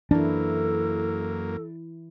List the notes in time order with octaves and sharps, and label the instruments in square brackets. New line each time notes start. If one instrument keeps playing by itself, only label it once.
[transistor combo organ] F#2 A#3 [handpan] E3 E4 [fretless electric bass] D4 [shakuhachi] A4